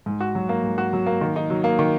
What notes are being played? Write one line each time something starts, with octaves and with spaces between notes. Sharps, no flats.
G#2
F#4
F#3
A#3
G#2
F#4
F#3
A#3
D#3
D#4
F#3
A#3
D#3